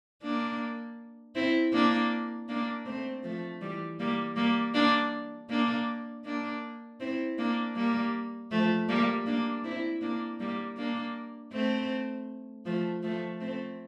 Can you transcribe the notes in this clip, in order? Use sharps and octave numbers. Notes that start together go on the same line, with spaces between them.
A#3 D4
C4 E4
A#3 D4
A#3 D4
A3 C4
F3 A3
E3 G3
G3 A#3
G3 A#3
A#3 D4
A#3 D4
A#3 D4
C4 E4
A#3 D4
G3 A#3
F3 A3
G3 A#3
A#3 D4
C4 E4
A#3 D4
G3 A#3
A#3 D4
A3 C4
F3 A3
F3 A3
A3 C4